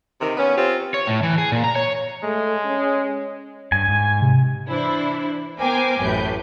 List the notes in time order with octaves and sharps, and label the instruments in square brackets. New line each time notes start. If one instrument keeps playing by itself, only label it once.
[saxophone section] C3 D#3
B3 C#4
C4 F4 G4
[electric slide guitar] C#5
A2
E3
G#4
A#2
A#5
C#5
[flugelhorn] G#3 [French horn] A3
[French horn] C#4
[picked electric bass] G2 [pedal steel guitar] G#5
[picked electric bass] G#2
[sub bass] C3
[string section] E3 D4 E4 C5
B3 A#4 C5 G5 G#5 D6
A1 F#2 A2 B4 G6